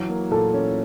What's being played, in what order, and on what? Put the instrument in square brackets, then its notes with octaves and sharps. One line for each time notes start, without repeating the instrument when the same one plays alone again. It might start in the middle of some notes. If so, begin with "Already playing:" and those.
Already playing: [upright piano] E3 F#3
A#3
[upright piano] A#2 [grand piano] A4
[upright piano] C#4